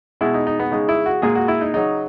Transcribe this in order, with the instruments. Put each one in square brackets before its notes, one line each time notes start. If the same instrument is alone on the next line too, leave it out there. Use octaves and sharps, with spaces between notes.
[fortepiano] B2 G#3 E4
D#4
D#4
B3
C#3 G#3 D#4
E4
F#4
A#2 G#3 G#4
F#4
E4
D#4
C#3 F#3 D#4